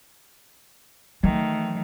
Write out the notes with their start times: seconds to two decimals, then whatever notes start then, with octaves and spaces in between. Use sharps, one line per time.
1.23 D#3 E3 F#3 A3